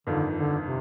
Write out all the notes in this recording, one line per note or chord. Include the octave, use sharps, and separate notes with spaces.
G1 F2 D3 D#3
D3
C3